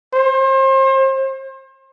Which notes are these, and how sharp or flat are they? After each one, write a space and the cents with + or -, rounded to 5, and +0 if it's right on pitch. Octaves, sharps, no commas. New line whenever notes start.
C5 +35